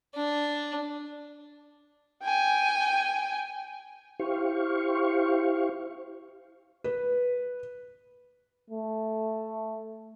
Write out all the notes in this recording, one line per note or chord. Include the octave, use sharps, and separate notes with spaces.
D4
G5 G#5
E4 G4 C5 F5 C#6
B4
A3